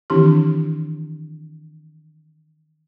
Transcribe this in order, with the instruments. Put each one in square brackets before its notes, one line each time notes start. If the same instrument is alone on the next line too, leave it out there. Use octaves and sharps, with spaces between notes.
[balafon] D#3 E3 C4 D4 E4 G4